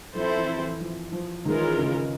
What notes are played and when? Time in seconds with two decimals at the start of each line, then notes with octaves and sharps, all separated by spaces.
0.15 F3 C4 E4 A4 C5
0.36 E3
0.58 E3
0.80 F3
1.12 F3
1.45 D#3 E3 G#3 C#4 F4 A#4
1.78 C#3